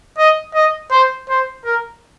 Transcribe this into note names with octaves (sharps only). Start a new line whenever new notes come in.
D#5
D#5
C5
C5
A#4